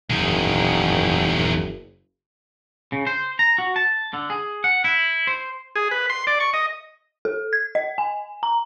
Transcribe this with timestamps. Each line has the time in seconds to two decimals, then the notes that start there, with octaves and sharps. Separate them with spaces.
0.10 F#1 E2 D#3
2.92 C#3
3.07 C5
3.39 A#5
3.58 F#4
3.76 A5
4.13 D3
4.30 G#4
4.64 F#5
4.84 E4
5.27 C5
5.76 G#4
5.91 B4
6.10 C6
6.27 D5
6.40 C#6
6.53 D#5
7.25 A4
7.53 G#6
7.75 D#5
7.98 G#5
8.43 A#5